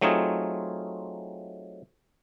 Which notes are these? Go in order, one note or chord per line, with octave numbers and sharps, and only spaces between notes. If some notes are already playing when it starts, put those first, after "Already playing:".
F#3 A3 C4 D#4 F4 G#4